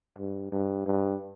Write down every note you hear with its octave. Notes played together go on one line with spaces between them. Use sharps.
G2
G2
G2